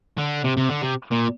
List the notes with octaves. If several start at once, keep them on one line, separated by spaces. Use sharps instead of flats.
D3
C3
C3
D3
C3
A#2